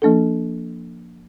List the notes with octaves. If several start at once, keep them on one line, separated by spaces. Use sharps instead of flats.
F3 A#3 D4 A4